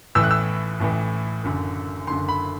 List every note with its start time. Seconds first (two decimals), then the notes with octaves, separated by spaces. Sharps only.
0.15 A1 A2 E3 E6
0.23 F#6
0.31 E6
0.80 A1 A2 E3
1.43 F#1 F#2 D3
2.07 F#1 F#2 D3 C6
2.29 B5